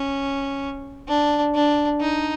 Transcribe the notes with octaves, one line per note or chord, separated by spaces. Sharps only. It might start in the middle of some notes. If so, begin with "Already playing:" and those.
Already playing: C#4
D4
D4
D#4